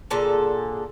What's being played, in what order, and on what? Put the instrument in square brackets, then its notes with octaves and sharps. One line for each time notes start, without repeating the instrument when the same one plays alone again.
[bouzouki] A#2 D3 A4 [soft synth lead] G#4